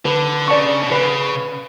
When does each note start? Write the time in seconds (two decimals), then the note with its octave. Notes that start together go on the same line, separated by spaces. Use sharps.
0.05 D3 B4
0.48 C#3 D5 A5 C#6
0.83 B2
0.91 C#3 B4